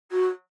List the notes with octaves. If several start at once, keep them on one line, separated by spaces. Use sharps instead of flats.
F#4